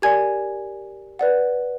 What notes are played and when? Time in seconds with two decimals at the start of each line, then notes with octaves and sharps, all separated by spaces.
0.02 G4 A#4 D5 G#5 G#6
1.19 B4 D5 F#5